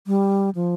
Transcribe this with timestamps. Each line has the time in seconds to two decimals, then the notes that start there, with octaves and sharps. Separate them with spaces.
0.07 G3
0.55 F3